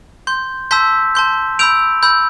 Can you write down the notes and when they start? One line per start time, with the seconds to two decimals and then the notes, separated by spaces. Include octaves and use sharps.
0.27 C6 G6
0.71 A5 C6 E6 G6 B6
1.15 A5 C6 G6
1.59 B5 E6 G6 D7 F7
2.03 B5 E6 G6